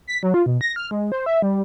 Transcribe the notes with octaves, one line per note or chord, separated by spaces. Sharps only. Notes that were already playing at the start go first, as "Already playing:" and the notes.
B6
F#3
F4
B2
A#6
F6
G#3
C5
E5
G3